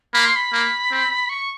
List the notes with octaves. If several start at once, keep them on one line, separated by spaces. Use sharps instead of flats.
A#3 B5
C6
B5
A#3
C4
C#6